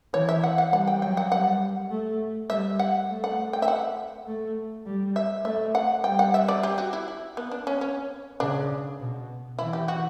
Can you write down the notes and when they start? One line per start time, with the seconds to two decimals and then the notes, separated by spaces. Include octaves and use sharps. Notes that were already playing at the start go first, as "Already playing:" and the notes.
0.13 E3 C#5
0.29 E5
0.44 F#5
0.58 F#5
0.72 G3 F#5
0.87 G5
1.02 F#3 G5
1.17 F#5
1.32 G3 F#5
1.91 A3
2.50 G3 E5
2.79 F#5
3.09 A3
3.24 F#5
3.53 G5
3.62 E5
3.68 F#5
4.27 A3
4.86 G3
5.16 E5
5.45 A3 E5
5.75 F#5
6.04 G3 G5
6.19 F#5
6.34 E5
6.48 D5
6.63 G4
6.78 F#4
6.93 E4
7.08 E4
7.37 B3
7.52 D4
7.67 C#4
7.81 C#4
8.40 C#3 D4
9.00 B2
9.58 E3 E4
9.73 G4
9.88 F#4